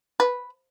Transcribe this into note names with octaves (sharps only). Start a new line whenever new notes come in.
B4